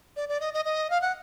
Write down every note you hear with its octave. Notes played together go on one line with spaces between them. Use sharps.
D5
D5
D#5
D#5
D#5
F5
F#5